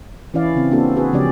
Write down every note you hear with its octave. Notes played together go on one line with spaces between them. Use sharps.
E3 C#4 E4 D5 F5
C#3 C4
A#3 C4 D4 F#4 A4
F#4 G#4 B4
C#3 F3 G#3 C#4 G4 D5